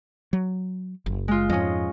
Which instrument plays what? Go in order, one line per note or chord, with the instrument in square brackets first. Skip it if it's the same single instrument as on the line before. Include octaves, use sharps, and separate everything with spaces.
[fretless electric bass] F#3
F#1
[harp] G#3 F4
[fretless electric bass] F2 G#2 [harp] C#4 D#5